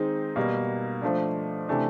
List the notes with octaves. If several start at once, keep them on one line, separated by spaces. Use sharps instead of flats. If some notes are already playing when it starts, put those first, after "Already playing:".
Already playing: D#3 G#3 C4 D#4
B2 G3 A#3
F3 A3 D4
C3 E3 A3 D4